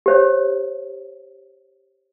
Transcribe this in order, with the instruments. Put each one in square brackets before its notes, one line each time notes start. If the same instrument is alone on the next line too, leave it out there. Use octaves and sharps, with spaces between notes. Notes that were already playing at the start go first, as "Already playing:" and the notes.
[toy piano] G4 C5 C#5